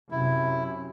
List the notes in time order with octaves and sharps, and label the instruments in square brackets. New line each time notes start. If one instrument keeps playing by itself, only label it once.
[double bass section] F#2 C3 [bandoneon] E4